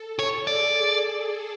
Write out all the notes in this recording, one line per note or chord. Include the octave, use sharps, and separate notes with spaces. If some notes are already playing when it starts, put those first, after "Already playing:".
Already playing: A4
C#5
G#4 D5